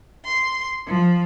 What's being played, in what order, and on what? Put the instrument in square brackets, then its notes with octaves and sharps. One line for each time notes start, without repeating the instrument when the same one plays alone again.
[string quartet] C6
F3